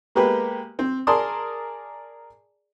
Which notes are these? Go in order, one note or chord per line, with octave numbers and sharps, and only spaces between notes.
G#3 A#3 B3 G4 B4
C4
G#4 A#4 D5 A5 C6 D#6